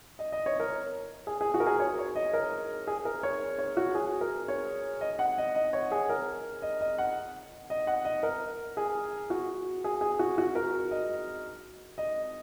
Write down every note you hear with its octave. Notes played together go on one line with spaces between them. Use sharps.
D#5
D#5
C#5
A#4
G#4
G#4
F#4
A#4
G#4
C#5
C#5
D#5
A#4
G#4
A#4
C#5
C#5
F#4
G#4
A#4
C#5
D#5
F#5
D#5
D#5
C#5
G#4
A#4
D#5
D#5
F#5
D#5
F#5
D#5
A#4
G#4
F#4
G#4
G#4
F#4
F#4
A#4
D#5
D#5